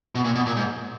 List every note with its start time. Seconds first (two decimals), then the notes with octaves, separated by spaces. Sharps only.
0.15 B2
0.25 A#2
0.35 B2
0.46 A#2
0.56 G#2